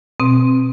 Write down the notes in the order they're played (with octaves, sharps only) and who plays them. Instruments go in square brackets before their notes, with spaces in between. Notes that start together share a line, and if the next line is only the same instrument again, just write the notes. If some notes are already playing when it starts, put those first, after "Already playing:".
[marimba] B2 C4